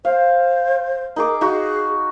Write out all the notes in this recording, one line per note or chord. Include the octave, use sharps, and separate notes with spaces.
C5 F5
D#4 G#4 A#4 D6
D#4 F#4 G#4